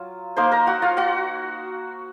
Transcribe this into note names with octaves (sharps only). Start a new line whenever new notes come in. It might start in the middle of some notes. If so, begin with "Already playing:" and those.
Already playing: F#3 F4
A#3 D#4 C5 C6
A#4 A#5
F#4 F#5
F4 F5
F#4 F#5